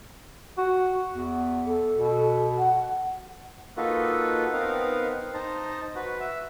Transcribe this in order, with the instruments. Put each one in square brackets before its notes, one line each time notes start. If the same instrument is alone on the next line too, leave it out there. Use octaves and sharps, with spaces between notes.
[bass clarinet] F#4
E2
[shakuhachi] A4
[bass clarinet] B2
[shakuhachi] F#5
[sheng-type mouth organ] A#3 D#4 F4 F#4 A4 B4
B3 C4 D#4 A#4 F5
D#4 C5 A5 A#5
F#4 B4
E5